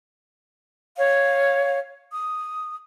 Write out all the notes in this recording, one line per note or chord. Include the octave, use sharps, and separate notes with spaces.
C#5 F5
D#6